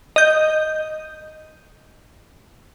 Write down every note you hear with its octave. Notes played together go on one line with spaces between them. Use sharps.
D#5 G6